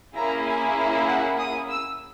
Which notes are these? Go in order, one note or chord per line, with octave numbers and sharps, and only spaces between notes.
A#3 C#4 E4 G#4 A#5
G#5
E5
F#5
D#6
E6